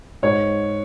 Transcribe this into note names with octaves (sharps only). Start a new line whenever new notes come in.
G#2 C#5